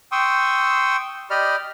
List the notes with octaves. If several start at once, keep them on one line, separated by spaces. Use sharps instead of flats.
G5 C6 C#6 D#6 E6
G4 D5 D#5 B5 F6